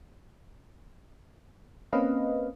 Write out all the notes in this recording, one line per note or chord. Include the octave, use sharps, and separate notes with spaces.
A#3 C4 C#4 B4 D#5 F5